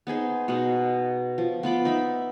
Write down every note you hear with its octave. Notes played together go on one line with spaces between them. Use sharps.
B3 D#4 G#4 C5
B2 D#4 G#4 F#5
F3
B3 F4 B5 D6
D#4 E5 B5